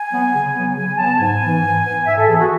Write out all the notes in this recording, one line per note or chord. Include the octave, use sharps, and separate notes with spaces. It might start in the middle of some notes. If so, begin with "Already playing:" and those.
Already playing: G#5
F#3 B3
C#3
F#3 B3
C#3 G#5
F#3 B3 A5
G#2 G#5
E3 B3
G#2
E3 B3
G#2 E5
A4
E3 B3 G#4
F#4